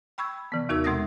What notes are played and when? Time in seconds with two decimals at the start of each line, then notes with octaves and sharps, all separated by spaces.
0.18 G5 B5 C#6 E6 G#6
0.52 C3 E3 B3
0.69 D#2 D#4 F#4 A#4 E6
0.84 B2 G#3 C4 E5 D#6 A#6